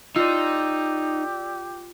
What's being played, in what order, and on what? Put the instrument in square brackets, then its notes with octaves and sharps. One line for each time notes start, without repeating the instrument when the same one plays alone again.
[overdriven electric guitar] D#4 [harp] F4 [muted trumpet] G4 [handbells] D5 E6